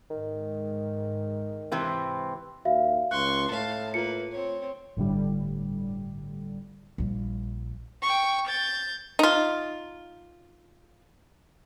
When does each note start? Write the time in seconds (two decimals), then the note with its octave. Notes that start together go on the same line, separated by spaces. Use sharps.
0.10 G#2 D#3
1.72 C3 E3 C4
2.65 D#2 F#4 E5 F5
3.11 C#2 C6 C#6 F#6
3.51 A2 F5 A5
3.94 A#3 F4 B4 C#7
4.32 C4 C#5
4.97 G1 A2 D3 G3
6.98 A#1 G3
8.02 G5 C#6
8.47 G6 A6
9.19 D#4 F4